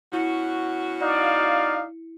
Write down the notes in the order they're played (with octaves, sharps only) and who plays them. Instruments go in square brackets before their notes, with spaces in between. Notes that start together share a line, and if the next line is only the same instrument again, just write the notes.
[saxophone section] B2 C#4 F#4 [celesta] E4 C#7
[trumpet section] D#4 F5 [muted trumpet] D5